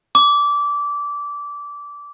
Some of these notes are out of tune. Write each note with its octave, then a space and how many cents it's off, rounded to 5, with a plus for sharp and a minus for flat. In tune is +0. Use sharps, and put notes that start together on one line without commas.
D6 -20